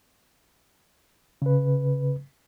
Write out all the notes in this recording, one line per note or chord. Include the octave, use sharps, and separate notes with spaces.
C#3 B4